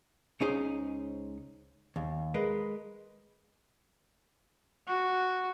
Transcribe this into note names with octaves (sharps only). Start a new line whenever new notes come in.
C#2 C#4 D#4 G#4 C5
D#2
G#3 A#4 B4
F#4